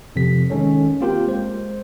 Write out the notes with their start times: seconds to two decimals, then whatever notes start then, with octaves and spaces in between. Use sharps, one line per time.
0.16 F2 C3 F3 A4 B6
0.50 D#3 G#3 C#4 A4 C#5
1.00 A#3 C4 F4 G4 A#4 G5
1.27 G#3 C5